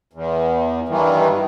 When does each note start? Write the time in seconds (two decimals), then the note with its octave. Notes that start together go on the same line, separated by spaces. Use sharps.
0.13 E2
0.89 G2 D#3 E3